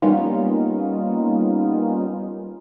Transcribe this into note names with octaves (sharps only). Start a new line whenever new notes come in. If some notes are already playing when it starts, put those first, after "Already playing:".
G3 A#3 B3 C#4 D#4 F4